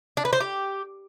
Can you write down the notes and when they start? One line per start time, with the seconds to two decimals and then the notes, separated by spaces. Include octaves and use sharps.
0.17 D4
0.25 B4
0.33 C5
0.40 G4